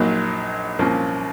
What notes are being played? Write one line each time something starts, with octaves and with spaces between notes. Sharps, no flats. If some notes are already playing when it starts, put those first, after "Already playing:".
Already playing: A#1 A#2 F#3 A#3 D#4
C2 A#2 F3 A#3 C#4